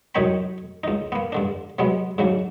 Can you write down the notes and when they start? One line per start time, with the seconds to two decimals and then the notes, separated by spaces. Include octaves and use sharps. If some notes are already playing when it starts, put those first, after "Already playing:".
0.15 C2 F#2 D#4 C#5 G5 B5
0.84 C#2 D#4
1.12 A#3 B3
1.32 G2 D3 D4
1.79 C3 F#3 G#3 B3
2.18 G#2 C#3 F#3 D4